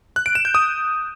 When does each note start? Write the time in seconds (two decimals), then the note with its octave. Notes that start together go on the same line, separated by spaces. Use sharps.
0.16 F#6
0.26 D7
0.35 E7
0.45 G6
0.55 D#6